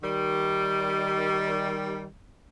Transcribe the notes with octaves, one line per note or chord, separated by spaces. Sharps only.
D#3 G3